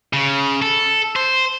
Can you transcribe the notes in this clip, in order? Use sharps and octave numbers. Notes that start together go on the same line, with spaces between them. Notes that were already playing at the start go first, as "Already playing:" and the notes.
C#3
A4
C5